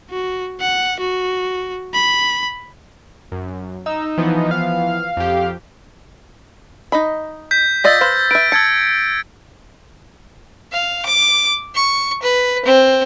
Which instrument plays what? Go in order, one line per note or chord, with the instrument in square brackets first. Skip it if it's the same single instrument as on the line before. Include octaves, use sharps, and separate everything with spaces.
[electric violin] F#4
F#5
F#4
B5
[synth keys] F#2
[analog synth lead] D#4 [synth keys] E6
[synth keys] E3 F3 B3
[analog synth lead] F5
[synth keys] F2 G4
[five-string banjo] D#4 D#5 B5
[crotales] G6 B6
[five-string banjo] F4 D5 D#5 [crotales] E6 A6 A#6
[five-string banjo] B4 C5 F5
[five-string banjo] B4 E5 [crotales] D7
[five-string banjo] A5 [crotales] E6 G#6 C#7
[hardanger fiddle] F5
D6
C#6
B4
C4